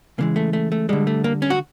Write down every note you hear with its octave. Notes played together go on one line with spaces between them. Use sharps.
C#3 E3 G#3 A#3
A3
A3
A3
D3 G3 G#3
A3
A#3
C#4
F#4